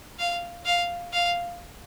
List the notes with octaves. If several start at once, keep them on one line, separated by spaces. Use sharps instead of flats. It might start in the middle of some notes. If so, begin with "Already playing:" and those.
F5
F5
F5